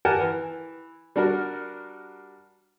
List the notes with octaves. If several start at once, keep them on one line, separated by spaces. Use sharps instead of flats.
G4 A#4 F#5 G#5 A5
E3
G3 D4 F#4 A#4